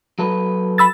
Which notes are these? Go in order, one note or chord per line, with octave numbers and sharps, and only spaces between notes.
F#3 A4 B4
B5 E6 A6